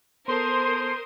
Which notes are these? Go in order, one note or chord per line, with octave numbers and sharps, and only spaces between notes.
B3 A4 A#4 C5 A5 C6 D#6 G6